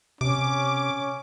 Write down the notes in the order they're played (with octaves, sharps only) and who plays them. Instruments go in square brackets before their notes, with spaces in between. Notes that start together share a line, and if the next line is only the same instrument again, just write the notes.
[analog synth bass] C3 [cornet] C#4 [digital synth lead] D6